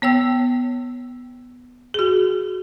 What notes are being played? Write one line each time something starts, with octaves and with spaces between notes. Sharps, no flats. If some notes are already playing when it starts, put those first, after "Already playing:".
B3 C#5 G5 E6
F#4 G#4